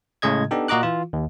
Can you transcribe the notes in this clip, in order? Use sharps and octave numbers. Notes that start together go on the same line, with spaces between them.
A2 C#3 G#3 D#5 G#6
B3 D4 D#4 G4 A4
A#2 F#4 D#5 A#5 D6 F#6
E3 F4
D#2